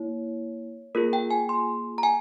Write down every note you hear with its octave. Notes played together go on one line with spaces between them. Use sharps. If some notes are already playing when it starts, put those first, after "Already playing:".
Already playing: A#3 E4 C#5
A#3 F4 G#4 A#4
G5
G#5
C6
A#5
G#5